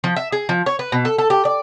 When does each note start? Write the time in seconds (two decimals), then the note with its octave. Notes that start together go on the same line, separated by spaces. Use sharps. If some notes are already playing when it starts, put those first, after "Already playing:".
0.04 F3
0.16 E5
0.32 G#4
0.49 F3
0.66 C#5
0.79 B4
0.92 B2
1.05 A4
1.18 A4
1.30 G4
1.45 D5